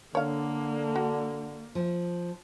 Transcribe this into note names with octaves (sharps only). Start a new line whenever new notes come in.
D3 A#3 C#5 F5
F#4
F3